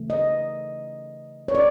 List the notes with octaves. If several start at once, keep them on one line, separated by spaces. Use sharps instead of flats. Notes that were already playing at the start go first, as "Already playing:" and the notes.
Already playing: C#3 E3 A3
D#5
C#5
D5